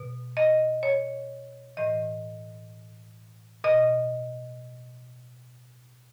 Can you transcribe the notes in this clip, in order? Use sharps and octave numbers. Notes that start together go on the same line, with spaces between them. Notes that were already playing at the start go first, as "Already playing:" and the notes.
Already playing: B2
D#5
C#5
A2 E3 D#5
B2 D#5